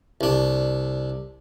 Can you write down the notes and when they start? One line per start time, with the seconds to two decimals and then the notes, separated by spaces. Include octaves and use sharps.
0.21 C2 D4